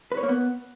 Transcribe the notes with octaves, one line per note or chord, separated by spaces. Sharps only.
B4
C#5
A#3
B3